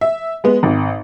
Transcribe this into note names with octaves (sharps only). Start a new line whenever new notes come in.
E5
G#3 B3
G#1